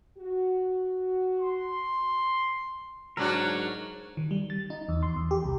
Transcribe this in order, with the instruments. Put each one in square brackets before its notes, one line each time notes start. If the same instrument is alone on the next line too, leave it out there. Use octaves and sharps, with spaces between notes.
[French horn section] F#4
[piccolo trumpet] C6
[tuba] G#2 [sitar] F#3 D4 F#4 [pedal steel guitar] A#4 C#5
[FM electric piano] D#3
G3
A6
D#4
E2
C6
E2
G4
C2